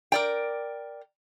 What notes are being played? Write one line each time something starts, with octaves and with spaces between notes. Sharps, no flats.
A#4 D5 G5